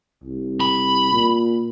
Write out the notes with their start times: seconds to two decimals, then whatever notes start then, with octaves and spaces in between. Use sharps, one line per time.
0.24 C2
0.60 B5
1.12 A#2